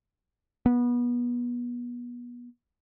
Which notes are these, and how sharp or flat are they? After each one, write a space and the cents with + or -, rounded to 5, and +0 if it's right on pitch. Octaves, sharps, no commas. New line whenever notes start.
B3 -30